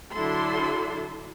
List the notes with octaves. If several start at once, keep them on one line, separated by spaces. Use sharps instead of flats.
D3 F#3 D4 E4 A4 C6